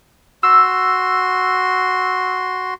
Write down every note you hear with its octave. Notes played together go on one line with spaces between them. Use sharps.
F#4 C6 E6